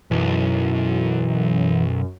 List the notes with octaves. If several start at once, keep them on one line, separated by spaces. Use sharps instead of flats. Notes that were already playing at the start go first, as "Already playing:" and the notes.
B1 F#2 E3